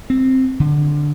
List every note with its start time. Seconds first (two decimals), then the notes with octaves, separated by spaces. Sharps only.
0.10 C4
0.60 D3